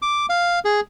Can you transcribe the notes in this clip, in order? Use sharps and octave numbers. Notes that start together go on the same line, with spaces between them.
D6
F5
G#4